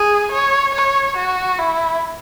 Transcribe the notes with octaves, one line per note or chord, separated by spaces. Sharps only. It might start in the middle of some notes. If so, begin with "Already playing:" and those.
Already playing: G#4
C#5
C#5
F#4
E4